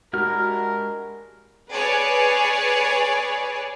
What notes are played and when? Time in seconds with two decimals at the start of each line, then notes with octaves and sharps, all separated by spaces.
0.13 G#3 D4 E4 F#4 G4 A#4 F6
1.71 G#4 B4 C#5 D5 G#5